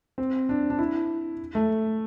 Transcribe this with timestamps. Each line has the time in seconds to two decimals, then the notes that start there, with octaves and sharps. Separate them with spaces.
0.18 C4
0.49 D4
0.70 D4
0.79 E4
1.55 A3